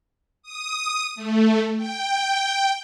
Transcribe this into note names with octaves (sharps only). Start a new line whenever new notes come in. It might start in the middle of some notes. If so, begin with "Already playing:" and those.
D#6
A3
G5